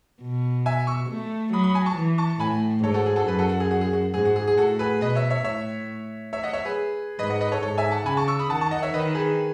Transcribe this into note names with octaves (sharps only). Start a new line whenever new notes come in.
B2
E5 G#5
C#6 E6
A3
F#3 B5 D#6
B5 D#6
G#5 B5
A5 C#6
E3
A5 C#6
A2 G#5 B5
G#2 A4 C#5
F#4 A4
G#4
F#4 A4
F#2 G#4 B4
F#4 A4
F#4
G#4
F#4
G#4
F#4
G#2 G#4
F#4
G#4
G#4
A2 F#4 A4
G#4 B4
B2 B4 D#5
C#5 E5
C#5 E5
A2 C#5 E5
C#5 E5
D#5 F#5
C#5 E5
G#4 B4
G#2 B4 D#5
D#5 F#5
B4 D#5
A4 C#5
G#2 A4 C#5
E5 G#5
F#5 A5
C#3 G#5 B5
A5 C#6
C#6 E6
B5 D#6
D#3 F#5 A5
A5 C#6
D#5 F#5
C#5 E5
D#3 B4 D#5
G#4 B4